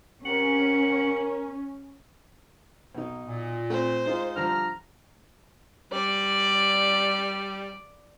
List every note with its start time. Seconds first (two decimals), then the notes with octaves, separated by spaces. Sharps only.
0.24 C3 C#4 G4 A#4 F#5
2.95 B1 D#4
3.27 A#2
3.70 A3 C4 C5
4.05 G#3 D#4 F4
4.36 D3 F3 G3 A#5 F6
5.92 G3 D5